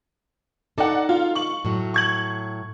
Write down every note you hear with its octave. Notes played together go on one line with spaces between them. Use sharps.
D#4 A4 D5 F#5
F4
C#6 F#7
A2 F#3
C#6 G#6 F#7